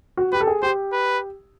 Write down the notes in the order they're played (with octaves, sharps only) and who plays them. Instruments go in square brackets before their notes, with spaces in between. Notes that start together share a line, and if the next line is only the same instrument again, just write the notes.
[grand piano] F#4
[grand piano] G4 [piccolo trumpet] B4
[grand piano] A4
G#4
[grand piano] G4 [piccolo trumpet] C5
[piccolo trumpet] B4